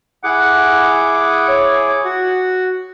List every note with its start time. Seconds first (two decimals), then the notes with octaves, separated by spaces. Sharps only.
0.24 E4 G#4 F#5 D6
1.13 F#5
1.48 C#5
2.05 F#4 F#5